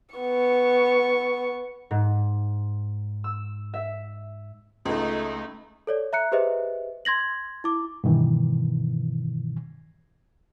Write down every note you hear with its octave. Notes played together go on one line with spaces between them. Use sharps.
B3 C#6
G#2
E6
E5
C#2 A3 D#4
A4 C#5 D5
E5 A#5 F#6 C#7
G4 G#4 B4 C5 D#5 E5
C6 G#6 A#6 F#7
E4 D6
G2 B2 D#3 E3